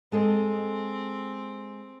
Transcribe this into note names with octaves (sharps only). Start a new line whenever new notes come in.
G#3 C4 A4 D#5